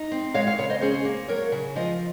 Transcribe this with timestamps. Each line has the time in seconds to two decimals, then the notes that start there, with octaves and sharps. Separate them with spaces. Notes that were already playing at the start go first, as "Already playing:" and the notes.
Already playing: D#4
0.11 C4
0.34 G#3 C#5 F5
0.47 C#5 F5
0.58 C#3 C#5 F5
0.70 C5 D#5
0.81 C#4 G#4 C5
1.05 A#3
1.28 F#3 A#4 C#5
1.52 C#3
1.75 F3 C5 D#5